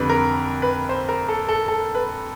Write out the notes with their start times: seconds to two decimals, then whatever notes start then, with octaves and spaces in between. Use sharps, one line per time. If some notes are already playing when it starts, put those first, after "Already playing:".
Already playing: F2 D3 G3 B4
0.09 A#4
0.62 B4
0.89 C5
1.09 A#4
1.29 A4
1.48 A4
1.68 A4
1.95 B4